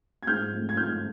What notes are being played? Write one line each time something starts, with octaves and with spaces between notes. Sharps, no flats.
G#6
G#2 F6 G6
F3 A3 C4
G#6
G#2 F6 G6